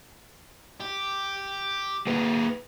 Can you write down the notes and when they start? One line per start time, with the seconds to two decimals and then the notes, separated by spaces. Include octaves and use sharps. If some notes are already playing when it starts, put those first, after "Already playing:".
0.80 G4
2.07 A#3 G#4 B4